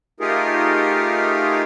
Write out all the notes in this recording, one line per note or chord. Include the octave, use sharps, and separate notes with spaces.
A3 D#4 F4 G4 G#4 A#4